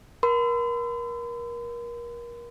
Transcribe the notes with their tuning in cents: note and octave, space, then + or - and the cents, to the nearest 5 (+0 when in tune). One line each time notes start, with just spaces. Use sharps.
A#4 +30 C6 -45